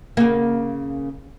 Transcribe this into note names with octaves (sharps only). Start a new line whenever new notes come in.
C#3 A#3